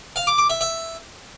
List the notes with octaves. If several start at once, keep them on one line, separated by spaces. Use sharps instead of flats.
F5
D6
D6
E5
E5